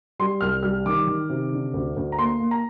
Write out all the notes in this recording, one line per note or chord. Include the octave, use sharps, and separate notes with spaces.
G3 C6
C2 F6
G3 F6
D#3 D6
D#3
C3
D3
D2
D2
A#5
A#3 C6
A#3
A#5